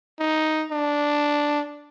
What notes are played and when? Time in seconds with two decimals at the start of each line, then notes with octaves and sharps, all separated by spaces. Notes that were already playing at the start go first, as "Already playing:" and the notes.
0.20 D#4
0.71 D4